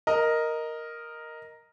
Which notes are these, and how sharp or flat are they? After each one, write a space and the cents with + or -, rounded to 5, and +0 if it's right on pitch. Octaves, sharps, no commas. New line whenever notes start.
A#4 +0 D#5 +0